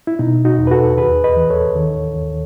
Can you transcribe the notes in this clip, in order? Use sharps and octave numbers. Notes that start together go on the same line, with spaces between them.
E4
B2 D#4
D#4 F#4
E2
B4
F#4 A4
D#2 G#4 B4
B4 D#5
E3
A4 C#5
D#3
D#2